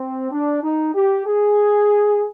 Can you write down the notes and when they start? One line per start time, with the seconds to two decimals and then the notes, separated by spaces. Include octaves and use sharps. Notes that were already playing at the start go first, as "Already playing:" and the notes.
Already playing: C4
0.32 D4
0.63 D#4
0.95 G4
1.26 G#4